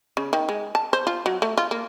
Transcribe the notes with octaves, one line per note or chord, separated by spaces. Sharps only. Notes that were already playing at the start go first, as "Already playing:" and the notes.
C#3
D#3
G#3
A5
C5
F4
F#3
A3
F4
A#3